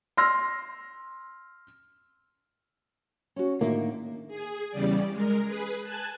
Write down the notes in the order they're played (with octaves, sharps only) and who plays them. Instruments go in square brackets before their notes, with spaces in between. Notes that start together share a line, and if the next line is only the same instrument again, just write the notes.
[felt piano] C6 E6 F6 A#6
[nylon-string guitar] C#4 F#4
[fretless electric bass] A2 D#3 A#3 [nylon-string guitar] D3 E5
[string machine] G#4
E2 C#3 G3 D5
G#3 A#4
G#4 B4
G#5 A5 F#6